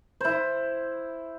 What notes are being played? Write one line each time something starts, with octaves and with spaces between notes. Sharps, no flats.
E4 C5